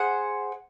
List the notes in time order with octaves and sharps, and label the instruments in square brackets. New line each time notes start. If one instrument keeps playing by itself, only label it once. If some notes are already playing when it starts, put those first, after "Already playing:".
Already playing: [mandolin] G#4 C5 F#5